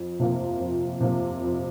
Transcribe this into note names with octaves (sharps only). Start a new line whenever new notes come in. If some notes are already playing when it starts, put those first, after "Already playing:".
Already playing: F2
C3 F3 A#3
F2
C3 F3 A#3
F2